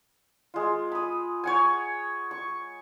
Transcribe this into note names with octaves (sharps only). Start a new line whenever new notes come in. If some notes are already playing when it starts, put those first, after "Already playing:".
G#3 F4
B5 D#6
C#5 F#5 G#5
C#6